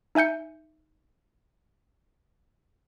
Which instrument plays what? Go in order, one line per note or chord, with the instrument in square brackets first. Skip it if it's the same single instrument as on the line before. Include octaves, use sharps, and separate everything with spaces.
[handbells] D#4 E5 G#5 G6 C#7